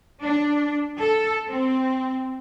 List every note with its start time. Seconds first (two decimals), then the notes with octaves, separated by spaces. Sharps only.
0.22 D4
0.99 A4
1.50 C4